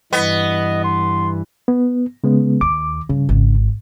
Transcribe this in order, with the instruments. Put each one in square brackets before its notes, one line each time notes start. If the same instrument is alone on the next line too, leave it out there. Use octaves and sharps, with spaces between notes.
[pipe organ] G2 E3 [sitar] B3 [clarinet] D#5
[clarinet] C6
[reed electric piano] B3
C#3 G#3 B3
[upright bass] D#2 [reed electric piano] D6
[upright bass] G2 [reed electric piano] C#3
[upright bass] G#1